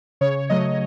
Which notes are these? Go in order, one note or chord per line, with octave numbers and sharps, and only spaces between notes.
C#3 C#5
F#3 A3 D#5